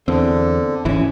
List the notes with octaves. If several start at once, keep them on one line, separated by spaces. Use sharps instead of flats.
E2 D3 C4
G#1 D2 E3 C#4 E4